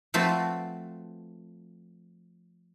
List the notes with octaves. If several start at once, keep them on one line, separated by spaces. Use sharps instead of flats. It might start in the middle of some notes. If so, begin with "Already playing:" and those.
F3 A3 C4 F#4 B4